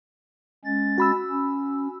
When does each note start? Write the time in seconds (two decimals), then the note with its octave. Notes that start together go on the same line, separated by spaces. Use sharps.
0.65 G#3 C#4 A6
0.98 F#4 B5 E6
1.31 C#4